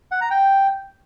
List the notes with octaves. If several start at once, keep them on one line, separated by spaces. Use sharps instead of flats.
F#5
A#5
G5